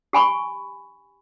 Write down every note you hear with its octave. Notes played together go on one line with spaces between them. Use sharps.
G4 G#5 B5 C#6